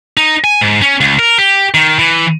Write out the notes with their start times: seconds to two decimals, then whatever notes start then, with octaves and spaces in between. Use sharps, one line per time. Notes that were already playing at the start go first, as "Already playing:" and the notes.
0.17 D#4
0.44 G#5
0.61 G#2
0.82 C#4
1.01 C#2
1.19 A#4
1.38 G4
1.74 D#3
1.99 E3